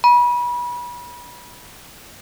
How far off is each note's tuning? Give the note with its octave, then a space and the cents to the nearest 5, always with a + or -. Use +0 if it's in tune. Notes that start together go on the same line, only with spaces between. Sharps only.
B5 -30